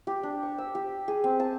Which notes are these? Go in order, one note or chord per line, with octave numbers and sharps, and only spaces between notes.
G4
D4
C#6
E6
G4
G#4
C4
A5